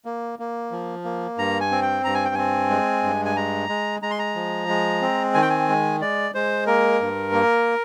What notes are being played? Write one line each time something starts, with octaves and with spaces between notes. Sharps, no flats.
A#3
A#3
F3
A#3
G2 A#5
G#5
C4
G5
G2 A#5
G#5
G5
C4 G#5
G#3
G2
G#5
G#3 A#5
G#3
G#3 A#5
C6
A#5
F3
G#3
C4
D#3 G#5
G5
G#5
G#3
G#3 D5
G#3 C5
A#3 A#4
G2
A#3